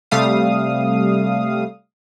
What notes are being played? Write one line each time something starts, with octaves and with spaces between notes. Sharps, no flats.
C3 G3 A3 F5 D#6